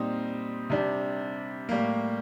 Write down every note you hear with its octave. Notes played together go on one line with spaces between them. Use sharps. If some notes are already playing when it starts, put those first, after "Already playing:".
Already playing: A#2 G3 C4 D#4
C3 G3 D4
A2 G3 A#3